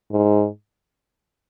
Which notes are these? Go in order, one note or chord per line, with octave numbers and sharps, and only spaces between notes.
G#2